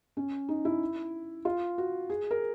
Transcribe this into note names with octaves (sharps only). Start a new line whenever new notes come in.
C#4
D#4
E4
F4
F#4
G#4
A#4